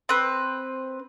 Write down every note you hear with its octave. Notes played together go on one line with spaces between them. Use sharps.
C4 B4